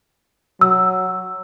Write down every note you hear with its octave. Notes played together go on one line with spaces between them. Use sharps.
F#3 E6